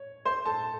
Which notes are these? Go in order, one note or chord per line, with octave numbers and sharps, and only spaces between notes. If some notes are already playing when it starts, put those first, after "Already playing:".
Already playing: C#5
C5 C6
A4 A5